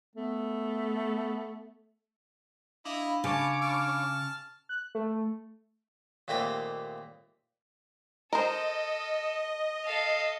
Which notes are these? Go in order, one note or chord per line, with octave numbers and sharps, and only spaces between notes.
A3 B3
D4 E4 D#5 F5 B5
C#3 C#5 A5 D6
A5 F6
F#6
A3
D#2 A#2 A3 C4 G4 D#5
A4 A#4 C5 D#5
A4 F5